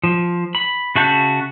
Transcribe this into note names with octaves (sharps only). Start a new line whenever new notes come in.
F3
B5
C#3 F#4 E5 A5 G6